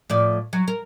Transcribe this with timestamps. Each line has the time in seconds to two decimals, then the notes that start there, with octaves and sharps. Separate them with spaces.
0.10 A2 F3 D5
0.53 F#3
0.68 A#4